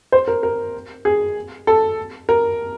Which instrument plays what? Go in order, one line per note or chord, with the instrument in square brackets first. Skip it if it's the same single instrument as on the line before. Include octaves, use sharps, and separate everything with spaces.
[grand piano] C5
A#4
A#4
G#4
A4
A#4